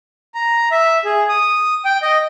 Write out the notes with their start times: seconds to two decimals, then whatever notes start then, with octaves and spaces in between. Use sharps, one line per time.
0.34 A#5
0.71 E5
1.05 G#4
1.29 D#6
1.85 G5
2.02 D#5